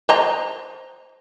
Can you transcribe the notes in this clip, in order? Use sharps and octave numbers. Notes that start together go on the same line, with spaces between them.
C5 D#5 A#5